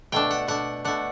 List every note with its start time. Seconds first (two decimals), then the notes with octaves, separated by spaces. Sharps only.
0.12 B2 A3 D4 G5
0.31 F#5
0.47 B2 A3 D4 F#5
0.85 B2 A3 D4 F#5